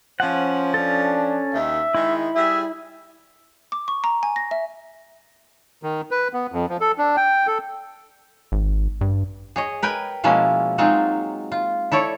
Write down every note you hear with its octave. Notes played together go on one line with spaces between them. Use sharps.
F3 C#4 C5 F#5
C#4 D4 A4
D#2 D#3 E5
D#3 G#3 E4
G3 G#4 E5
D6
C#6
A#5
G#5
A#6
E5
D#3
B4
B3
F2
F3
A4
D4
G5
A4
G#1
G2
G#4 C#5 D#5
A#4 B4 G5 G#5
B2 F3 G#3 A#3 C#4 E4
F#3 G#3 C4 D#4 F4
F4
E4 A4 C#5 D5